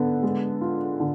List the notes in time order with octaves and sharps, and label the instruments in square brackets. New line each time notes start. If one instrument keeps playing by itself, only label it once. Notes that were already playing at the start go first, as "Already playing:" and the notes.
Already playing: [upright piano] D3 B3
G#3
F4
D3